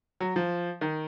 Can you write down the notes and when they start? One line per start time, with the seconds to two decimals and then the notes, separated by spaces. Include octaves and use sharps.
0.20 F#3
0.36 F3
0.81 D#3